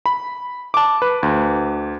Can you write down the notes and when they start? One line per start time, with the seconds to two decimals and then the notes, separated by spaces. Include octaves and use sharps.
0.06 B5
0.74 A5 D6
1.02 B4
1.23 D2